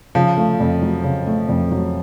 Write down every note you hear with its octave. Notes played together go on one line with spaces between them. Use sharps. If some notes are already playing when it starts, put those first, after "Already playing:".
C#3 F3
A3
F2
F#3
C#3
A3
F2
F#3